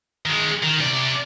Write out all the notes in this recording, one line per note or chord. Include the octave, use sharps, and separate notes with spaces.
D#3 G#3
D#3
C3 D5